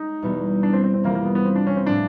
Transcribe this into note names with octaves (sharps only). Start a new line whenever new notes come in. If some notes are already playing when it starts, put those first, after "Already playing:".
Already playing: G#3 C#4 D#4
E2 B2 G3 B3
D4
C4
C4
C4
F2 C3 E3 G3 A#3
A#3
B3
B3
C4
D4
C#4
C4
A2 F3 A3 C#4 D4